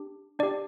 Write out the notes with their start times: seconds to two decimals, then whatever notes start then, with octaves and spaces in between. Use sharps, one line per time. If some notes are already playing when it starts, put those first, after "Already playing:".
Already playing: D4 G4
0.39 D4 G4 D5